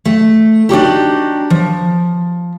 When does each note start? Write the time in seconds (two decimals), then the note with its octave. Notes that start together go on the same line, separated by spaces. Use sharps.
0.05 A3
0.69 D4 D#4 F#4 G4
1.50 F3